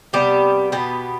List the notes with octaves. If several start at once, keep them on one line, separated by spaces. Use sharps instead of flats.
C3 G3 B3 G4
B2 B3 G4